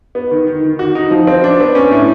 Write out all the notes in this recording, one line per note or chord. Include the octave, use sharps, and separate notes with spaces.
B3
D#3
D#3
D#3
F#4
D#4
F3
C4
D4
B3
C#4
A2